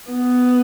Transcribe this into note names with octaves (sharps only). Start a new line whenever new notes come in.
B3